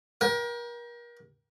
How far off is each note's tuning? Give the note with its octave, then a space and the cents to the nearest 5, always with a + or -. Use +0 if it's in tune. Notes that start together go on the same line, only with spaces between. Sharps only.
A#4 +35 G5 +5